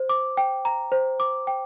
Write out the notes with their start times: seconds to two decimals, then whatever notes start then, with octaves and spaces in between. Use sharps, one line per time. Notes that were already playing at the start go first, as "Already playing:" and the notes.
Already playing: C5
0.09 D6
0.37 G5
0.65 A#5
0.92 C5
1.20 D6
1.47 G5